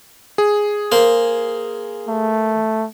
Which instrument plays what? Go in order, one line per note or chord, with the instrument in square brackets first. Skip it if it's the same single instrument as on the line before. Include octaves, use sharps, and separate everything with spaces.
[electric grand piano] G#4
[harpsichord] A#3 C5
[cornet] A3